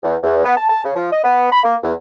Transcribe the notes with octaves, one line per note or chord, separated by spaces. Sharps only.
E2
E2
B3
A5
A5
C#3
F3
D#5
B3
B5
A#3
E2